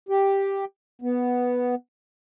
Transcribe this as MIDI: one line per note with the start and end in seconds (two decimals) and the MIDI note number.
0.09 0.65 67
1.02 1.75 59